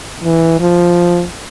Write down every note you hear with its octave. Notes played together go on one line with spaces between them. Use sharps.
E3
F3